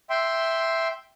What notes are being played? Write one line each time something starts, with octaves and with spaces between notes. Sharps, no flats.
E5 G5 C6